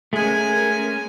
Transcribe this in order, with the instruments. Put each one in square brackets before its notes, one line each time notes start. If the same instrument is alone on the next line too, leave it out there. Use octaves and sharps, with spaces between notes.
[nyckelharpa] G#3 G#5 [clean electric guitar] A3 G#4 [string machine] C#4 A#4